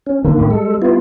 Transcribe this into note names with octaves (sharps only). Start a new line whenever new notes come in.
C#4
D3 D#3 A#3
A2
G3 G#3 A4
B3 E4 F4